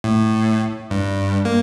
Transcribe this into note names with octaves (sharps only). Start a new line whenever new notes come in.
A2
G2
A#3